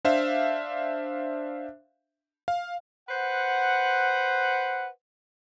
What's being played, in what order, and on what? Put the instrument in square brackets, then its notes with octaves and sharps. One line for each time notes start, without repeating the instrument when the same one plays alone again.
[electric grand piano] D4 C5 E5 F5
F5
[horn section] B4 C5 F#5